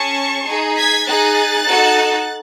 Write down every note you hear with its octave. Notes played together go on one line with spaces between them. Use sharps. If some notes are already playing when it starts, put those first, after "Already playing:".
Already playing: C#4 G#4 A5 C#6
D#4 G#4
G#6 B6
D#4 G#4 F#6 A6
D#4 F#4 A4